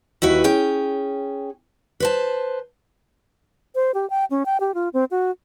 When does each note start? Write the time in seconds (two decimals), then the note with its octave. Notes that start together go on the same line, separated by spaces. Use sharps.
0.22 D#2 E4 F#4 B4
0.44 C#4 G#4 G5
2.00 B4 C5 A5
3.75 C5
3.94 G4
4.10 G5
4.31 C#4
4.46 G5
4.60 G4
4.74 F4
4.93 C4
5.11 F#4